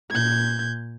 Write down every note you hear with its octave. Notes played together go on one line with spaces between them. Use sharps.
A#2 G6 G#6